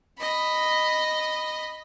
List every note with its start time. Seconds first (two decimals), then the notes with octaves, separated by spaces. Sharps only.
0.19 D#5 B5